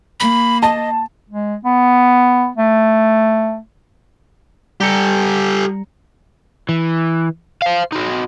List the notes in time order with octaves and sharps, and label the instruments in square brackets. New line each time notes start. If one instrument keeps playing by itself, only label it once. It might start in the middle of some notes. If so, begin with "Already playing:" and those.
[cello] A#3 [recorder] B5
[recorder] D#5 [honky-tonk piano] A5
[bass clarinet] G#3
B3
A3
[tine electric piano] G3 A#5 C#7 [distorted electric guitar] G4 A4
[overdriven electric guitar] E3
C5 F5
D#4 F#4